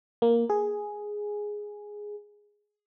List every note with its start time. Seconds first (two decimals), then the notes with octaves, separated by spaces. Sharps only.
0.22 A#3
0.50 G#4